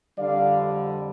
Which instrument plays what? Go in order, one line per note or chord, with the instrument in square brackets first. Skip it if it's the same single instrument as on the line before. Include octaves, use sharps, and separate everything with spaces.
[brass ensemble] F2 D3 G3 D5 F5